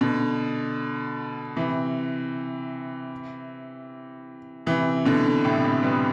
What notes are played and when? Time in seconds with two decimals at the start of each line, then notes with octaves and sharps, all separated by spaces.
0.01 B2 D3
1.56 C3 E3
4.67 C3 E3
5.05 B2 D3
5.45 A2 C3
5.64 A2 C3
5.83 G3 B3